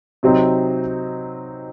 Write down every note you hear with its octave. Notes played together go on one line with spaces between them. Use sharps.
C3 F#3 C4 D#4